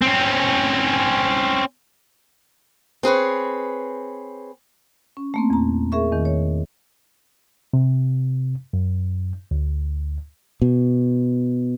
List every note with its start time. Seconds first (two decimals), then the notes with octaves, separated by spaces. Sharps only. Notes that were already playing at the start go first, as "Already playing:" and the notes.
0.02 C4 C#4
3.03 C4 G#4 B4 C#5
5.17 C#4
5.34 A3 A#3 C4
5.50 E2 A#2 A#5
5.92 G#4 A#4 E5 C#6
6.12 E2 D#3
6.25 C#5
7.73 C3
8.73 F#2
9.51 D2
10.62 B2